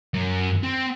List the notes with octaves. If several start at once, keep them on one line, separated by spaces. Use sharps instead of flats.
F#2
C4